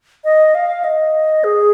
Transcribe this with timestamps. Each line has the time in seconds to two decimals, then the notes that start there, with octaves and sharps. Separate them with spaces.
0.24 D#5
0.55 F5
0.84 D#5
1.44 G#4